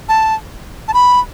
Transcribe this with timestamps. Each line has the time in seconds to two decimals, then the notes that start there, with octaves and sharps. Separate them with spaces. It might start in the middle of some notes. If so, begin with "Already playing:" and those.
0.09 A5
0.88 A5
0.94 B5